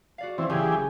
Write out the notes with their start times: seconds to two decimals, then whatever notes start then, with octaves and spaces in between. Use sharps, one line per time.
0.18 F#4 D5 F5
0.38 E3 C4
0.50 F#1 E3 G4 G#4 C#5 G#5